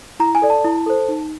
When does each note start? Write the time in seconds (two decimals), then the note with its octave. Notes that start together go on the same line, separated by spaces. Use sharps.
0.20 E4 A#5
0.35 G#5
0.42 A4 D5
0.50 A5
0.65 E4
0.86 A4 C5
1.09 D#4